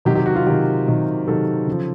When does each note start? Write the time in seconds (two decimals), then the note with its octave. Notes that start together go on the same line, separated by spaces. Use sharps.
0.05 C3 D#3 F#3 G4
0.15 G4
0.26 F#4
0.36 F4
0.46 C3 D#3 F#3 G4
0.87 C3 D#3 F#3
1.27 C3 D#3 F#3 A4
1.67 C#3
1.72 F3